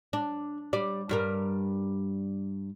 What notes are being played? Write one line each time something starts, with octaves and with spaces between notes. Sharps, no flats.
D4
G3 D5
G2 G3 A#4